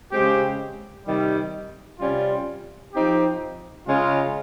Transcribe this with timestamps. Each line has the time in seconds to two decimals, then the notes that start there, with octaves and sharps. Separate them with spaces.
0.12 C#3 G#3 C4 G4
1.06 C3 D#3 G3
2.00 C3 G3 C#4 F4
2.94 F3 C4 D#4 G4
3.87 C#3 G#3 C#4 F4